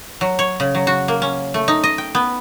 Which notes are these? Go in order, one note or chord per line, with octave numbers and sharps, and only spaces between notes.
F#3
C#5
C#3
F#3
F#4
A#3
C#4
A3
D#4
D#5
G5
B3